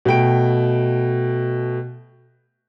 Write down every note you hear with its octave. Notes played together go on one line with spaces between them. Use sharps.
B2 A3 G5 D7